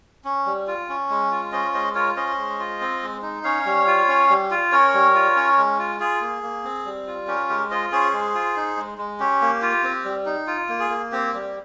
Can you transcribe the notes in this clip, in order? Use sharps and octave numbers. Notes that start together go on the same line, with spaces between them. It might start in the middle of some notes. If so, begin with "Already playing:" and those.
C#4
G3
F4
C#4
G#3
F4
C#4 C5 D#5
G#3 C5 D#5
F4 A#4 C#5
C#4 C5 D#5
G#3
F4
C4
G#3
D#4
C#4 C#5 F5
G3
F4
C#4
G3
F4
C#4 A#4 C#5
G3
F4
C#4
G#3
F4
F4 G#4
A#3
A#3
C4
G3
F4
C#4 G4 A#4
G#3 G4 A#4
F4 C5 D#5
C#4 G#4 C5
G#3
F4
D#4
G#3
G#3
C#4 G4
A#3
F4
C4
G3
D#4
F4
A#3
G#4
A#3
C4 G4
G3